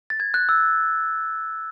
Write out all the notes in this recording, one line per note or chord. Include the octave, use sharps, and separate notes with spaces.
A6
G#6
F#6
E6